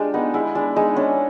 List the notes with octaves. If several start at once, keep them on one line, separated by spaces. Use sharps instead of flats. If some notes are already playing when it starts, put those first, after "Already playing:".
Already playing: G#3 D4 F4 G4
B3 D#4
G#3 E4
G#3 D4
G#3 D#4
C#4 D4